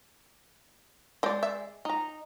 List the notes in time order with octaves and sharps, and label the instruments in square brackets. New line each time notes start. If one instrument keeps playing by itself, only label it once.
[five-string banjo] G#3 D5 [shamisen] D#5 G5
[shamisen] E5
[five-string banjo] D#4 A#5